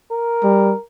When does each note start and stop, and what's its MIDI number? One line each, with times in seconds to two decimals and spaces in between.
0.12 0.81 70
0.43 0.74 55